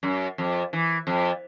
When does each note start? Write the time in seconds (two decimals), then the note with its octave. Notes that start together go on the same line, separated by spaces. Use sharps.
0.03 F#2
0.38 F2
0.73 E3
1.07 F2